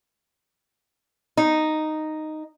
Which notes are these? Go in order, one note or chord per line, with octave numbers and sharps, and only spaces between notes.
D#4